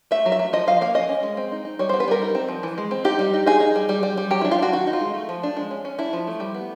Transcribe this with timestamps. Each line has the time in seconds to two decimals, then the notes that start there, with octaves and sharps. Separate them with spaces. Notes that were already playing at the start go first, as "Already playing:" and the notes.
0.11 A3 E5
0.26 F#3
0.32 E5
0.39 F#3
0.53 F3 D#5
0.67 F3 F5
0.81 A#3 F5
0.95 C#4 D#5
1.09 C#4
1.23 G#3
1.37 C4
1.52 D#4
1.65 D#4
1.79 G3 C#5
1.89 B3 C5
2.00 B4
2.08 G3 A#4
2.22 D#4
2.35 C4
2.48 F3
2.63 E3
2.78 G#3
2.91 C4
3.04 D#4 G4
3.19 G3
3.34 D#4
3.46 D#4 G#4
3.60 D#4
3.76 G3
3.89 G3
4.03 G3
4.17 G3
4.31 F#3 G4
4.41 D4 E4
4.51 F4
4.58 D4 F#4
4.72 D#3 F#4
4.87 D#4
4.93 F4
5.01 G#3
5.14 A3
5.29 F3
5.43 D4
5.57 G#3
5.71 C#4
5.85 C#4
5.99 D4 E4
6.13 F3
6.27 A3
6.40 G3
6.54 B3